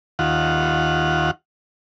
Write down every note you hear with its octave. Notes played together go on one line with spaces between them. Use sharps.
D#2 F4 F#5